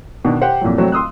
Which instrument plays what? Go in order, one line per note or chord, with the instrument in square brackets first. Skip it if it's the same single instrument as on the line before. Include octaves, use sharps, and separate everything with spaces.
[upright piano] B2 D#3 D4
G4 C5 F#5 G5
F2 A#2 E3 F#3
F1 F#3 A3 C4 F#4
C6 D#6 E6 F#6